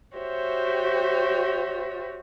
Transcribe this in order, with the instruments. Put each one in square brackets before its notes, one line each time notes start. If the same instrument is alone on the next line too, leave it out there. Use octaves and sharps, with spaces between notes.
[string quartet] F#4 G4 C5 C#5 E5